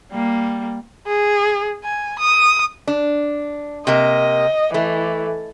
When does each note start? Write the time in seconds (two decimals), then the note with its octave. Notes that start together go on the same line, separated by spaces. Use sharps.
0.11 G3 A#3
1.07 G#4
1.84 G#5
2.20 D#6
2.88 D4
3.87 C3 A#3 D#5
4.74 E3 A3